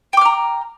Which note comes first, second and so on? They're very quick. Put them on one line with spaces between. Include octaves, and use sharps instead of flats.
G5 D6 F6 A#5